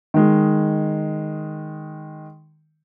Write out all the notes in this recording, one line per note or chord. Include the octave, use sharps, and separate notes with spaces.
D#3 G#3